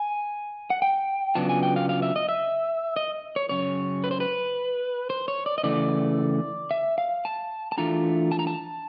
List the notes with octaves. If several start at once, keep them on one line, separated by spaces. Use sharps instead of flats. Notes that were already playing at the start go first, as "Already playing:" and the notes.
Already playing: G#5
F#5
G5
C#3 F#3 B3 D4 F4 A5
G#5
G5
F5
F5
E5
D#5
E5
D#5
C#5
F#2 C#3 C#5
B4
C5
B4
C5
C#5
D5
D#5
C#3 E3 A3 D5
E5
F5
A5
A5
E3 A3 D4 F4 A#5
A5
A#5
A5